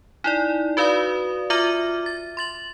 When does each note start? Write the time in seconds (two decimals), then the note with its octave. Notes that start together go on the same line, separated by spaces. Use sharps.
0.24 D#4 E4 D5
0.77 F#4 B4 D5 F5 B5 D#6
1.50 F4 E5 D6 F6 A#6 D#7
2.06 A6
2.37 C6 A6 F#7